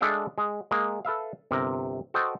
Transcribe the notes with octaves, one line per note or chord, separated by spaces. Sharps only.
G#3 D4 A4 E5 F5 G5
G#3
G#3 A#3
A4 B4 E5 F5
G1 C3 A#4
F#4 A4 C5 D#5 G5